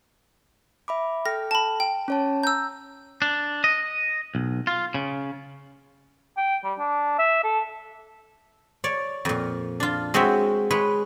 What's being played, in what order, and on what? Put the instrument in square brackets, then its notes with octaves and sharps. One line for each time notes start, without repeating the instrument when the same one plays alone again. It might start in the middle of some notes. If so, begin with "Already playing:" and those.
[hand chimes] E5 B5 D6
[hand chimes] A4 G5 F6 [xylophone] A#6
[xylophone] A5 B5
G5
[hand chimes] C#4 C#5 A5
[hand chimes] A#5 [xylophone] E6 G6
[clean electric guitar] D4
D#5
B1
F4
C#3
[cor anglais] G5
G3
D4
E5
A4
[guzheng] C#5 D5
F2 A#2
D4 F4
G#3 C4 F#4 C#5 E5
G#3 B4 C#5